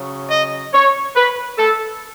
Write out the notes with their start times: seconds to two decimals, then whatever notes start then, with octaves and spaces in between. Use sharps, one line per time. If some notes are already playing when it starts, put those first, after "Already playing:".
Already playing: C#3 F#3
0.31 D#5
0.74 C#5
1.16 B4
1.59 A4